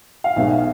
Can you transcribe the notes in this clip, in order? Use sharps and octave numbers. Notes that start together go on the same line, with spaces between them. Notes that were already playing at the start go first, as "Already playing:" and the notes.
F5
B1 B2 G#3 E5
F5